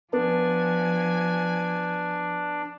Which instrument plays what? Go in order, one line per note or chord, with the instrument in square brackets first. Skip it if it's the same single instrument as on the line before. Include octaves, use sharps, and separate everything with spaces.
[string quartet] F3 G#5 [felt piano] B3 [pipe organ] D4